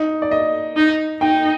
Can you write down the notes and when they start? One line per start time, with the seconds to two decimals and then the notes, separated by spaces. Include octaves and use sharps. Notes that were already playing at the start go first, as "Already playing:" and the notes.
Already playing: D#4
0.22 D5
0.31 D#5
0.76 D#4
1.21 D#4 G5